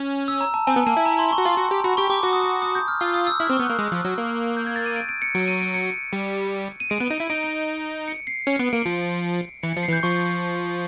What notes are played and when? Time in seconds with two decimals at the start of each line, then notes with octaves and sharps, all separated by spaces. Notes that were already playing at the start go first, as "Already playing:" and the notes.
Already playing: C#4
0.28 E6
0.41 A#5
0.54 A5
0.67 C4 G#5
0.76 B3
0.87 A#3 A5
0.97 E4
1.05 A#5
1.19 C6
1.32 C#6
1.38 F#4
1.45 F4 C6
1.58 F#4
1.71 G4
1.84 F#4 B5
1.97 G4 C#6
2.10 G4 D6
2.23 F#4 D6
2.33 D#6
2.42 D6
2.62 D#6
2.75 G6
2.88 F6
3.00 F4 E6
3.14 D#6
3.27 E6
3.40 E4 F6
3.50 C4
3.53 C#6
3.59 B3
3.66 A#3 F#6
3.79 G#3
3.92 F3
4.05 F#3
4.18 A#3
4.57 G6
4.67 G#6
4.76 A6
4.86 D#7
4.96 D7
5.09 D7
5.22 C#7
5.35 F#3 D7
5.48 D#7
5.61 D7
5.74 C#7
6.13 G3
6.80 D#7
6.90 G#3 D7
7.00 B3
7.10 D#4 D#7
7.20 E4
7.30 D#4 D7
7.43 D7
8.08 C#7
8.27 C7
8.47 C#4 C#7
8.59 B3 D7
8.73 A#3 D7
8.86 F3
9.63 E3 C#7
9.73 F3 C#7
9.83 C7
9.89 E3 G6
10.03 F3 C#6